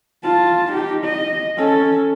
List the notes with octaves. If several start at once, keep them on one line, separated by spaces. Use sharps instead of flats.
F4 A5
D#4 G4
D#5
C#4 A4